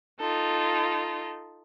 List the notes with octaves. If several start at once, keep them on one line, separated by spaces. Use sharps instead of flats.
D#4 F4 A4